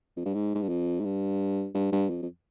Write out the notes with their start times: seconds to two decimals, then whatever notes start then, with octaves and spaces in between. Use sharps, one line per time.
0.17 F2
0.25 G2
0.34 G#2
0.55 G#2
0.62 G2
0.69 F2
1.00 G#2
1.04 G2
1.74 G2
1.92 G2
2.10 F2
2.22 F2